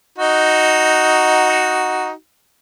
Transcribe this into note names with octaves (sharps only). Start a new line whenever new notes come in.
D#4 F#4